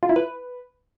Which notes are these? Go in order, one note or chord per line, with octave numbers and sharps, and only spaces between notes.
F4
E4
B4